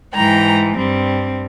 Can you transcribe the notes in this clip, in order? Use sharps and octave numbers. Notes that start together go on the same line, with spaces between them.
G#2 E3 G#3 G5 A#5
G2 G3 C4